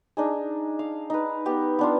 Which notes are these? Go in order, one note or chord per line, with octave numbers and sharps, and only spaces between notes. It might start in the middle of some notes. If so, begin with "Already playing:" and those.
D4 D#4 G#4
F5
D#4 B4
B3 G4
B3 D4 F4